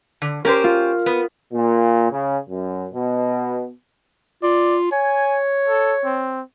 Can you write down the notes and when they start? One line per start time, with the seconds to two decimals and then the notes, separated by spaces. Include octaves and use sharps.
0.22 D3
0.45 C#4 G4 A#4 C5
0.64 F4
1.06 B3
1.52 A#2
2.10 C#3
2.49 F#2
2.93 B2
4.43 F4 D5
4.92 C#5 G#5
5.68 A4
6.04 C4